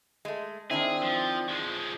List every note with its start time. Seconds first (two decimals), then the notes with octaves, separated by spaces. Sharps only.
0.25 G#3 A3
0.71 D#3 C4 D4 E4 G#4
1.03 F3
1.49 F3 G#3